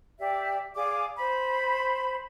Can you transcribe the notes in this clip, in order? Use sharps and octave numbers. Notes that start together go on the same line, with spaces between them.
G4 D5 E5
G#4 D5 F5 D6
C5 B5